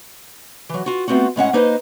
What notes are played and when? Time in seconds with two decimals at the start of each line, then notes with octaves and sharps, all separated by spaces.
0.69 E3 F#3
0.86 F4 F#4
1.08 A3 B3 C4 F4 F#4
1.36 A2 G#3 C#4 F#5
1.53 A#3 D#4 B4 C5 D#5